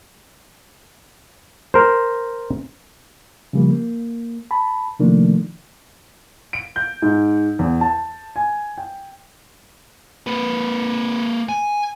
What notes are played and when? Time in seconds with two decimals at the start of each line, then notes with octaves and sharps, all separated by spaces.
1.74 A#4 C5
3.53 C#3 F3 G3 A#3
3.70 A#3
4.51 A5 B5
4.99 C3 D#3 F3 A3 A#3 D4
6.53 D7
6.76 G6
7.02 G#2
7.59 E2
7.81 A5
8.36 G#5
8.78 G5
10.27 A#3 B4
11.49 G#5